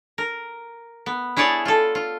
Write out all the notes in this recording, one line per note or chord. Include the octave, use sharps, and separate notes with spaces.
A#4
B3
E4 G#4 C#5 D5 A5
F4 A4
F4